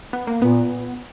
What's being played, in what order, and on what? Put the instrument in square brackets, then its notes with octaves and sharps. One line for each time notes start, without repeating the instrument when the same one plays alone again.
[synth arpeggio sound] B3
A#3
[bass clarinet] A#2 [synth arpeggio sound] B3